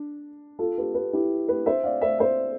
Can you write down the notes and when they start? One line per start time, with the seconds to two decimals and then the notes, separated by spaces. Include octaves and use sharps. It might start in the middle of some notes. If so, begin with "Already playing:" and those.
Already playing: D4
0.59 F4 A4
0.78 G4 B4
0.94 G4 B4
1.13 E4 G4
1.48 G4 B4
1.66 C5 E5
1.84 D5 F5
2.01 C5 E5
2.19 C5 E5